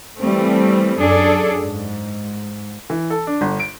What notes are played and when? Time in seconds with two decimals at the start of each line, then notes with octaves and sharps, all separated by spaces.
0.19 E3 G3 A3 C4
0.98 F#2 D4 G#4 A4 D5
1.61 G#2
2.90 E3
3.10 A4
3.27 D4
3.41 G1
3.60 D7